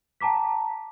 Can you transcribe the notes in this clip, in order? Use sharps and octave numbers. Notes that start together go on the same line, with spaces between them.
G5 A5 A#5 D6 B6